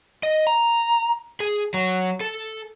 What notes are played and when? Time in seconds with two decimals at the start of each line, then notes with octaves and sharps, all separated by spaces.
0.23 D#5
0.47 A#5
1.40 G#4
1.74 F#3
2.21 A4